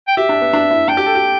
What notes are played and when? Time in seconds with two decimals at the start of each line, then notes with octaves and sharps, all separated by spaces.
0.08 G5
0.17 G4 E5
0.29 D4
0.41 B3
0.53 D4
0.71 E4
0.88 D4 G5
0.97 G4
1.06 A4
1.15 G4